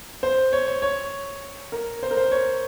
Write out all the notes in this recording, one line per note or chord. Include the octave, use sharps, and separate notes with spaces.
C5
C#5
C#5
C#5
A#4
C5
A#4
C5
C#5